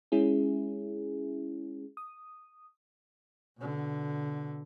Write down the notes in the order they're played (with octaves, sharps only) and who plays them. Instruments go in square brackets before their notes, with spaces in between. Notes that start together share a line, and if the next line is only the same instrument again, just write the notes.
[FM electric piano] G#3 C#4 E4 G#4
D#6
[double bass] B2 D3